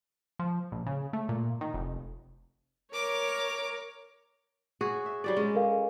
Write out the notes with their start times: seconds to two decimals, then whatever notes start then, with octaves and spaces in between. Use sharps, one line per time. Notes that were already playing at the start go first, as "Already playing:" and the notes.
0.39 F3
0.72 A#1
0.86 C#3
1.13 A3
1.29 A#2
1.61 D#3
1.74 F1
2.94 A#4 C#5 D6
4.81 F#4 G#4 C#5
5.06 E5
5.24 F#3 G3 D5
5.36 G#3 C#4
5.55 A4 A#4 F5